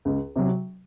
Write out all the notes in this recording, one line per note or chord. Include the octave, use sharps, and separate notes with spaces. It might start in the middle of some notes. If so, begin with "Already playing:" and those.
C#2
C3 F#3